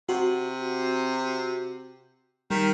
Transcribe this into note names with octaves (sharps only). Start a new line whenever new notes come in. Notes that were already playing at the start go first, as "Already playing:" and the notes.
C3 F#4
D#3 G3 B6